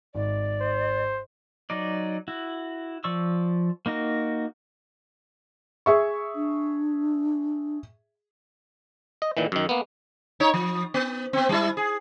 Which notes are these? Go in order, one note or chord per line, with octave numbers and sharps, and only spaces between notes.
G#1 D5
C5
F#3 D#4 D5
E4 F#4
F3 D5 C#6 E6
A#3 D#4 F#4 A#4
G#4 E5 C#6
D4
D#5
A#2 D#3 E3
F#2 D#3
A#3 B3
D#4 C#5
F3
B3
B3 C4
G3 E4
G#4